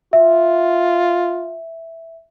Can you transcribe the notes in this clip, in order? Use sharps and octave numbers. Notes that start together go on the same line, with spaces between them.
F4 E5